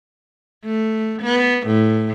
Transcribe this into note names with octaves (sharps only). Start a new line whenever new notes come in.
A3
B3
A2